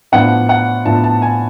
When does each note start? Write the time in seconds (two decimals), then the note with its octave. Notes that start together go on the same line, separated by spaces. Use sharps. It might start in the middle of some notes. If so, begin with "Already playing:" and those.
0.12 A2 F3 B3 D4 F4 F#5
0.49 F#5
0.85 A2 F3 B3 D4 F4 A5
1.04 A5
1.22 G#5